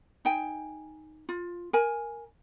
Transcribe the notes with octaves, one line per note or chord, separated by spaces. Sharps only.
D#4 G5 G#5
F4
A#4 G#5